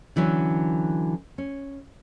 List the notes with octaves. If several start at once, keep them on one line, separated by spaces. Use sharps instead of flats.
D3 E3 F#3 C#4
C#4